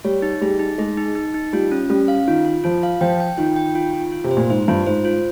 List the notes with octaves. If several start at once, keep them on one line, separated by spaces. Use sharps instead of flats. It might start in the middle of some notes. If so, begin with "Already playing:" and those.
G3 C#5
D#4
G3 G#4
D#4
G#3 G#4
D#4
D#4
D#4
G3 F4
C#4
G3 C#4
F5
D#3 F4
F4
F3 F4
F5
F3 G5
G5
D#3 F4
G5
F4
F4
F4
C3
C5
A#2
G#2 C5
G2 F4
G#2 C5
F4